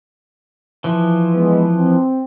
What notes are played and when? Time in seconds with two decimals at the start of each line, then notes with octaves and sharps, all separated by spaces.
0.84 E3 F3
1.33 G#3 B3
1.77 C4